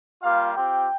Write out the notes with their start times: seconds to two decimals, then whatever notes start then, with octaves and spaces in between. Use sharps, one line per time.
0.22 G3 A#3 F4 G4 F5
0.55 C4 F4 G4 G5